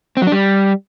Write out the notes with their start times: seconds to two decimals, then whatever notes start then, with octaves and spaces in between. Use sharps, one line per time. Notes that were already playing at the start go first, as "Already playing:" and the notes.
0.17 C4
0.22 F#3
0.27 D4
0.32 G3